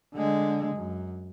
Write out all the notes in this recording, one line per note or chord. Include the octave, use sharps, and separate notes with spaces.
D3 G#3
F#2